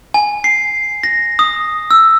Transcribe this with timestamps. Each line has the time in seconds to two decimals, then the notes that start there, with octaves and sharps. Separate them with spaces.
0.14 G#5
0.44 C7
1.03 A#6
1.39 D#6
1.91 E6